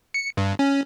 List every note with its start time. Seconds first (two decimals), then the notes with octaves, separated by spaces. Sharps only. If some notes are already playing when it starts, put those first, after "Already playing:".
0.14 C#7
0.37 G2
0.59 C#4